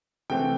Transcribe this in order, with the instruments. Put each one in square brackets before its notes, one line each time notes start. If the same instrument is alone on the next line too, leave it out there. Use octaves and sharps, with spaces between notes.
[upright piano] C3 E3 A3 C4 G5